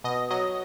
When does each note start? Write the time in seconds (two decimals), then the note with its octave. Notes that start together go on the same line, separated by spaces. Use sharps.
0.04 B2 D#5
0.31 F#3 D#5